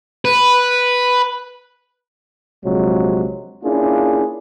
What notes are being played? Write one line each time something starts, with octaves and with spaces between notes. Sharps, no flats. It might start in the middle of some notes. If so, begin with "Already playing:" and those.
B4
A#1 C3 F3 F#3 G#3
A#3 C#4 D4 E4 F4 G#4